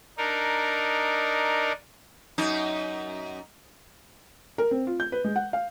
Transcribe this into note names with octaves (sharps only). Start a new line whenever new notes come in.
D4 D#4 A#4
F#2 D#4
A#4
C4
F4
G6
B4
G#3
F#5
F5